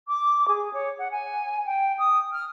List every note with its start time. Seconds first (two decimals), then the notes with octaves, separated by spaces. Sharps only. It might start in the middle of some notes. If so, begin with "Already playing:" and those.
0.08 D6
0.48 G#4
0.73 C#5
0.98 F#5
1.11 G#5
1.65 G5
1.98 D#6
2.32 F6